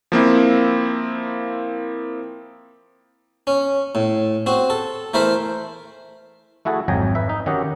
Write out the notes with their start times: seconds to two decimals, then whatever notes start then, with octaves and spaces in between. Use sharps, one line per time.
0.12 F3 A#3 C4 E4
3.47 C#4
3.95 A2
4.46 C4 F#4
4.70 A4
5.14 E3 A3 A#4 C5 B5
6.65 A3 E4 F#4 G#4 A4
6.88 G#1 F2 F#3 G5 G#5 A#5
7.15 B4 E5
7.29 D#4
7.46 D#3 C#4 F#4 G4 D#5